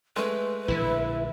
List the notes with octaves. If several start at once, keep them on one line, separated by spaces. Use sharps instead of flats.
G#3 A3 B4
A#1 D3 E3 E4